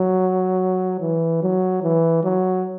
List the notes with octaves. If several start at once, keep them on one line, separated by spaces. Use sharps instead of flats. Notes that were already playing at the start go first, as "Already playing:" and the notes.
Already playing: F#3
E3
F#3
E3
F#3